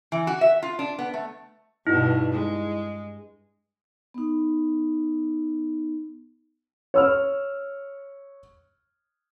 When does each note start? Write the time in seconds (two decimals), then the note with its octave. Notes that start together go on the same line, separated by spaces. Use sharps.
0.12 E3
0.27 F#4
0.41 E5
0.62 F4
0.79 D4
0.99 B3
1.14 A3
1.87 G2 B2 D#4 E4 F#4
2.32 G#3
4.14 B3 D#4
6.94 C#5 E6 F6